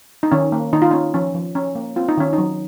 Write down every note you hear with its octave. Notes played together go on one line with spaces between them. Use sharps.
D#4
D#3 C#4
A#3
D#3 D#4
F4
C#4 D#4
F3 C#4
F3
C#4
A#3
C4 F4
D#4
D#3 C#4
D#4
F#3